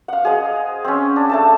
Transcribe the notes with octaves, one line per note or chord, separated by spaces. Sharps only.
F5 F#5
G#4 C5 D#5
C4 C#4
D4
A3 A5 E6